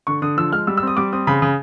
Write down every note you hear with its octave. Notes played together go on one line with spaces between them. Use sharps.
D3 C#6
D3 D#6
F3 E6
G#3 F6
G3 E6
E6
C4 D#6
G3 D6
C4 D#6
C#3 B5
C#3